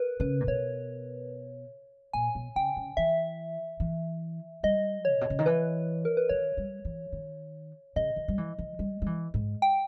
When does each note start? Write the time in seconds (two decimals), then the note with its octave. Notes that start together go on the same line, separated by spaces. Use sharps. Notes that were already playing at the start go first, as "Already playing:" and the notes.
Already playing: A#4 B4
0.20 C#3 B4
0.41 A#2
0.47 B2 C#5
2.13 A#2 G#5
2.35 B2
2.56 C#3 G5
2.77 C#3
2.97 E3 E5
3.80 E3
4.63 G3 D#5
5.05 C#5
5.12 A#2
5.21 B2
5.30 C#3
5.39 D#3
5.46 E3 B4
6.05 A#4
6.17 B4
6.29 D#3 C#5
6.57 G3
6.85 E3
7.12 D#3
7.96 C#3 D#5
8.16 D#3
8.28 G3
8.38 E3
8.58 E3
8.79 G3
9.02 G3
9.06 E3
9.34 G#2
9.62 G5